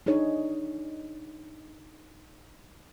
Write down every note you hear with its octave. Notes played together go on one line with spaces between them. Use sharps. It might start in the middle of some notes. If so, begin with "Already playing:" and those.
D4 D#4 G#4 C#5